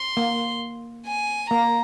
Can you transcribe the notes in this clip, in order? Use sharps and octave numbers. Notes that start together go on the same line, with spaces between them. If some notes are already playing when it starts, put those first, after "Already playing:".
Already playing: C6
A#3
G#5
A#3 A#5